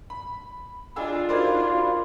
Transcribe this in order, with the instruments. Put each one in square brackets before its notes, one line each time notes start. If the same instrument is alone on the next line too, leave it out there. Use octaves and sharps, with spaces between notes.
[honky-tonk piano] B5
[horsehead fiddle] D4 F4 [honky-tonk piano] G#4 F5 E6 [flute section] D#5
[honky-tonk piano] D#4 A#4 D5 [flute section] F#4 F5 B5 [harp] C5 G#6